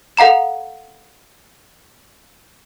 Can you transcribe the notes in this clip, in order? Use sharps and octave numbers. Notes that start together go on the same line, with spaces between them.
A4 F5 F#5 A#5 E7